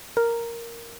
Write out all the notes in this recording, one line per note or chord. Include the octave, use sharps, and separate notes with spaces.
A#4